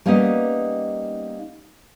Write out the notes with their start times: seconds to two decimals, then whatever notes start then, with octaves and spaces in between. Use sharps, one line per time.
0.06 G3 A#3 B3 C#4 D#4 D#5